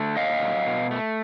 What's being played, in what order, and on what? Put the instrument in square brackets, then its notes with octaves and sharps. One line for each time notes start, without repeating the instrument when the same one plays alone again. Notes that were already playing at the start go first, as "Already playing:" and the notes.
Already playing: [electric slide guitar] D3 A3
A#2 D#5 F5
F#3
B2
A3